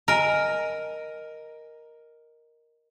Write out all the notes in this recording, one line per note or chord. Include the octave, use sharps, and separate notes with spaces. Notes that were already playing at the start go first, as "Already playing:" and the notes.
A#4 D#5 G#5